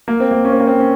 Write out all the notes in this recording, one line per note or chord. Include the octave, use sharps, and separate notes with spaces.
A#3
C4
A#3
C#4
C4
A#3
C4
C#4